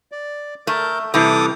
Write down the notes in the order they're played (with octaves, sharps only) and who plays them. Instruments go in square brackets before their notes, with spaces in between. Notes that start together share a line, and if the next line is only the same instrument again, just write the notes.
[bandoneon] D5
[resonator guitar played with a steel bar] A3 [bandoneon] A#4 G6
[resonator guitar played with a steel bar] C3 E3 G3 [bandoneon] A4 D6 D#6